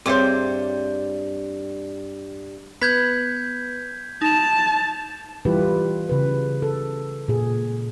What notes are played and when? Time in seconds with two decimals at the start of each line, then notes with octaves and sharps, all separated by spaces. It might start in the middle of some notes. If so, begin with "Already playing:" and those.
0.06 G2 G3 C4 G#4 C5 C#5 E5 D6
2.82 B3 B4 G6 G#6 B6
4.22 D#4 A5 F7
5.45 E3 G3 E4 F4 G4 B4
6.09 C#3 B4
6.62 A4
7.28 A#2 G#4